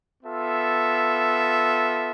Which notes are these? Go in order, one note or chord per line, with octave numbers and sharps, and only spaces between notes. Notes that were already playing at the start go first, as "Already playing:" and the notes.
B3 F4 A4 E5